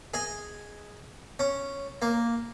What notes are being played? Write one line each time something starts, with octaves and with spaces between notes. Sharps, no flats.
G#4 D#5
C#4
A#3